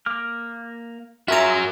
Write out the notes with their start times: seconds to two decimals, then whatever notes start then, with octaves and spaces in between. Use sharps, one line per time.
0.06 A#3 D6 F6
1.28 F4 F#4 G#4 A#4 E5 A#5